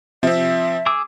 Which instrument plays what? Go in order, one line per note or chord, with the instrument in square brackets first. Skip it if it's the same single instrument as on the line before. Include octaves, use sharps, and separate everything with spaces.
[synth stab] C3 [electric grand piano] F3 C4 [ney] E5
[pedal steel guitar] G#4 D6 E6